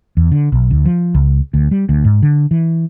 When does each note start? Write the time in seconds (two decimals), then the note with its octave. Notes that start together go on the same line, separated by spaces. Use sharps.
0.17 E2
0.32 D3
0.52 B1
0.71 D2
0.85 F3
1.15 C#2
1.54 D2
1.71 G3
1.89 D2
2.05 G#2
2.23 D3
2.51 E3